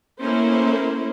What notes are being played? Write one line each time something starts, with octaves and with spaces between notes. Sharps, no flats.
A3 A#3 C#4 E4 A#4 C5